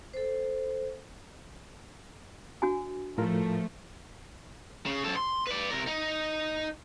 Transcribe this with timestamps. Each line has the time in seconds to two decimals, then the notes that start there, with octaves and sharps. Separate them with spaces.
0.14 A4 C5
2.62 D4 F#4 G#5
3.18 A2 F3 A3 F4 A#4
4.86 C#3
5.05 F#2 A4
5.16 C6
5.47 B4 D5
5.70 C3 A#4
5.87 D#4